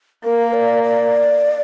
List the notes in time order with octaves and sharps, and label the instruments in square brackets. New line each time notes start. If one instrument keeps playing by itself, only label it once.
[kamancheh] A#3 [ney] A#4
[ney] D5
D5